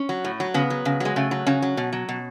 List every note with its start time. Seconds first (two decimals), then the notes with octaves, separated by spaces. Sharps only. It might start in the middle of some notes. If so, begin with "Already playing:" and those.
Already playing: C#4
0.09 F#3
0.24 A2
0.40 F#3
0.54 C#3 B3
0.70 F#3
0.85 C#3
1.00 F#3 G#3
1.16 C#3 A3
1.31 F#3
1.47 C#3 C#4
1.62 F#3
1.77 B2
1.93 F#3
2.09 B2